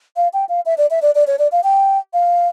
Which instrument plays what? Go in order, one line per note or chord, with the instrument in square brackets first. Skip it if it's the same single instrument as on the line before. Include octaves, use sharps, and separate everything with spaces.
[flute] F5
G5
F5
E5
D5
E5
D5
D5
C#5
D5
F5
G5
F5